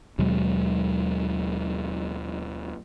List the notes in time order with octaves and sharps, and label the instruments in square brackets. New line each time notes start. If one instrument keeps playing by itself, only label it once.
[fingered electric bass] D#2 B2 F#3 G#3